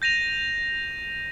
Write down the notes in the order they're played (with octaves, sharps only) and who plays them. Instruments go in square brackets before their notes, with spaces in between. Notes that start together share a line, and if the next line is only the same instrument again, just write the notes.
[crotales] G6 A#6 D#7 F7